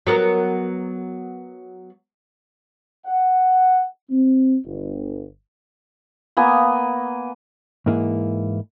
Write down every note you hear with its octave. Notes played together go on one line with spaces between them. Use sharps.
F#3 B3 A#4
F#5
C4
G1
A#3 B3 G#5 A#5
G#2 E3 A#3 E4 G#4